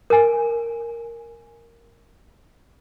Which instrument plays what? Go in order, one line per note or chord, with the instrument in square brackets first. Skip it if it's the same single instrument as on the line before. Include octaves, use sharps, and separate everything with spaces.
[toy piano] A#4 G#5